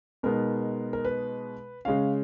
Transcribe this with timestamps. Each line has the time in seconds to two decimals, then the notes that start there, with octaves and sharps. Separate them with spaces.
0.23 B2 G#3 B3 D#4 A#4
0.93 A#4
1.05 B4
1.85 C#3 G#3 C#4 F5